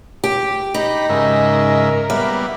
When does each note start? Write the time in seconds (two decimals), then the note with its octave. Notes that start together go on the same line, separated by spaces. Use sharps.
0.24 G4
0.74 D#4 G4 D#5 B5
1.09 G#2 C#3 A#4 E5
2.10 G3 A#3 B3 E5